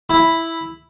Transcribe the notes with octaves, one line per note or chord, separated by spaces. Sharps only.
E4